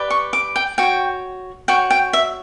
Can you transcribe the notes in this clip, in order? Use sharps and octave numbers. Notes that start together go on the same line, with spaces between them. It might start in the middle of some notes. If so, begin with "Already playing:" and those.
Already playing: G4 B4 D5
C#6
D6
G5
F#4 C#5 G5
F#4 C#5 G5
G5
E5